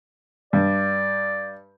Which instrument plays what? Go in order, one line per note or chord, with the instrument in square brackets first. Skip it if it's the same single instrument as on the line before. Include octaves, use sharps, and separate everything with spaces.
[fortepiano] G2 [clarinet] D5